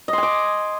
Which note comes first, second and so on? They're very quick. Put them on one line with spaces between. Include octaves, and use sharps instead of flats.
D#5 C6 G#5 D6